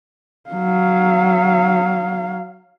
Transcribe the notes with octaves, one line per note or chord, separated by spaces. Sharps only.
F#3 F5